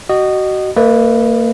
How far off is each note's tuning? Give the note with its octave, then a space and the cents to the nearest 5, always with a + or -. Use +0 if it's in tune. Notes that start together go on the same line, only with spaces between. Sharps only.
F#4 +30 D#5 -20
A#3 -35 B4 +0 D#5 +0